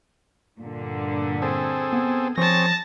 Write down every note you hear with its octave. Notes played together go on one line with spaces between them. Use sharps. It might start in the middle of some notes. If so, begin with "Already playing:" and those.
G2 A#2 D3
C4 G#4 A4
B3
F3 C4 G#4 C#5 A5 A#6